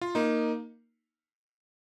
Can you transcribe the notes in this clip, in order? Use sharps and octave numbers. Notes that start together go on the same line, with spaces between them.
F4
A#3 D#4